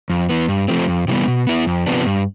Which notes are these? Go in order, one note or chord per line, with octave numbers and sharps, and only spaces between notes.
F2
E3 B3
G2
F3 A3 C4
F2
C3 E3 G3 B3
B2
B3 E4
F2
C3 F3 B3 D4
G2